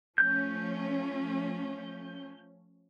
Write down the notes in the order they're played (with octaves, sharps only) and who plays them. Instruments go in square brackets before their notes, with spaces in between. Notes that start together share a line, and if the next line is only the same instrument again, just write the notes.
[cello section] F3 A3 C#4 [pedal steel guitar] G6